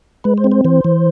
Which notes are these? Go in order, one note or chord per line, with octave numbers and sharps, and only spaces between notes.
G#3 B4
C5
C4
C5
E3 C5
E3